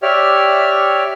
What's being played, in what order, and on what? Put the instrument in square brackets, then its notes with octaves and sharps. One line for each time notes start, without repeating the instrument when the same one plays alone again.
[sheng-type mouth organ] G4 C#5 D5 E5 F6